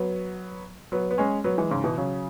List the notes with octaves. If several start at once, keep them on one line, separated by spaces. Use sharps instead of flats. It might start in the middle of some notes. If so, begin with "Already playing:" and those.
Already playing: F#3 B3
F#3 B3
B3
G#3 C#4
F#3 B3
E3 G#3
G#2 C#3
B2 E3
C#3 F#3